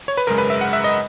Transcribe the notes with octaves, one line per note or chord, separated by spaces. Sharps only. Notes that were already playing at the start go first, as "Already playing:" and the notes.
C#5
B4
G#1 F#2 C#3 G#3 A#4
B4
E5
F#5
E5
D#5